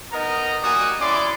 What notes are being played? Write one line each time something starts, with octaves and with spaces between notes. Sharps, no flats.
B3 D#4 A#4 D#5 A#5
G3 A#3 F#4 G#5 D#6
C#4 E4 D5 C6 D6